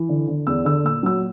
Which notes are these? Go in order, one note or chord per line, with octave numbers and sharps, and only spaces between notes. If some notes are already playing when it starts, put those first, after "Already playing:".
Already playing: E3
D3
D3
E2 E6
D3 E6
A#2 E6
F#3 E6